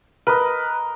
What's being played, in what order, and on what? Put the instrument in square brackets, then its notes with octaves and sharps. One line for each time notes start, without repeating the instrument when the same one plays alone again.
[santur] A#4 D#5 [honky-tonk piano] B4